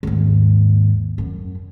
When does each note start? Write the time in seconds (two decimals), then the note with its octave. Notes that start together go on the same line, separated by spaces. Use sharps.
0.03 D#2 G#2
1.18 F#2